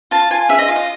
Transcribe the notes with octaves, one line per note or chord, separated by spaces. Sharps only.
F4 A5
F4 G#5
G#4 E5
D#5
F4
D#5